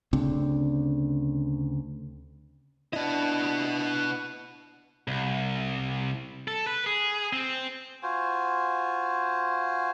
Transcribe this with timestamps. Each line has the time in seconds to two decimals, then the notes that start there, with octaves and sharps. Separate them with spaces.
0.13 D2 C#3 C4 D4
2.93 B3 D4 E4 D#5
5.08 C2
6.48 A4
6.66 B4
6.86 G#4
7.33 C4
8.03 F4 F#4 C5 G#5